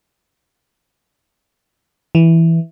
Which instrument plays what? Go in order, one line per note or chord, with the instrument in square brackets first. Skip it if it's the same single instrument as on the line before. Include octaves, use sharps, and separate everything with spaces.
[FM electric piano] E3